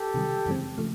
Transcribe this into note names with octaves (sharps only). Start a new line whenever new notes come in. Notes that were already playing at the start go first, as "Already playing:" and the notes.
Already playing: G4 A4
C3 D#3 G3
F#2 C#3 E3 G#3 C4
C#3 F3 A3